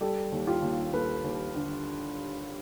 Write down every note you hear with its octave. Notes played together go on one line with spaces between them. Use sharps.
G3 G4 A4
D#2
F4 G4
D#2
D#2 A4 B4
D#2
D3